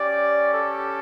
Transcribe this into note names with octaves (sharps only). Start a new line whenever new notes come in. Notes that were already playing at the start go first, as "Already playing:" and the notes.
Already playing: C#4 G4 D5
A4